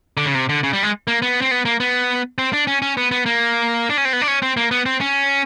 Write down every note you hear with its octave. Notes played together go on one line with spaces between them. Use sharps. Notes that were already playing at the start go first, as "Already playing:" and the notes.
D3
C#3
C3
D3
C#3
G3
G#3
A#3
B3
C4
B3
A#3
B3
C4
D4
C#4
C#4
B3
B3
A#3
D4
C#4
C4
B3
D4
C#4
C4
A#3
B3
C4
C#4